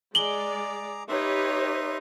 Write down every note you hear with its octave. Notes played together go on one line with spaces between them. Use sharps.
G#3 G#4 D5 A#5 D6 F#7 G7
D#4 G4 B4 C#5 E5 C6